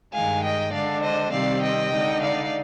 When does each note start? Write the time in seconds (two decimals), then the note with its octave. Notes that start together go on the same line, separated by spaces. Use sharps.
0.12 G2 D#3 G#3 F5 G#5
0.43 D#5 G5
0.72 D3 G#3 D4 D5 F5
1.03 C5 D#5
1.32 C3 D#3 G3 C4 D5 F5
1.62 D#5 G5
1.92 D3 G#3 D#4
2.22 D5 F5